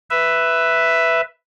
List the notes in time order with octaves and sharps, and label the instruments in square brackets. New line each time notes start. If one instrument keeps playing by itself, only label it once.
[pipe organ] B4 E5